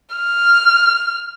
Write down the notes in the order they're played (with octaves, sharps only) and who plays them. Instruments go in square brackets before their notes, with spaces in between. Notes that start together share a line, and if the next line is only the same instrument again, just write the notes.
[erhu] F6